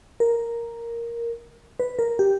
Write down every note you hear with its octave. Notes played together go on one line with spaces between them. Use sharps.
A#4
B4
A#4
G4